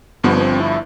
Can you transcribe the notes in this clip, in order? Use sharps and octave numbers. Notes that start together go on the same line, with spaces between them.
G1 G2 F3 B3
B3
C4
E4